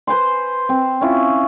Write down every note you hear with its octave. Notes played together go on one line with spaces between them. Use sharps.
B4 C5 G#5 C6
C4
C#4 E4 F4